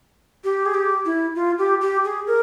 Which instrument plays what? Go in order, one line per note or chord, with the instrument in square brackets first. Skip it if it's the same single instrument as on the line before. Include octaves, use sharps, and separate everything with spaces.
[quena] G4
G#4
G4
E4
F4
G4
G4
G#4
A#4